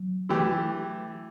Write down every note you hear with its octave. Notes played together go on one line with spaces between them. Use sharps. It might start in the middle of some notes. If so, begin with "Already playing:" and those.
Already playing: F#3
E3 A3 E4 G4